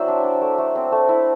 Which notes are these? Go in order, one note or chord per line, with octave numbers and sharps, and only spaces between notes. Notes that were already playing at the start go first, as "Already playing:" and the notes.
Already playing: F#3 C4 E4 C5 D5 E5
D4
D4
A3
A3
C4
A3
E4